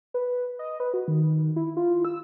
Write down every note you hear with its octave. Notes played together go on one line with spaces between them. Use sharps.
B4
D#5
B4
F#4
D#3
E4
F4
E6